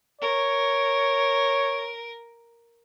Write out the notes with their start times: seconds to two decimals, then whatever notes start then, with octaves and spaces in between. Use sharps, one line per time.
0.21 A#4 C#5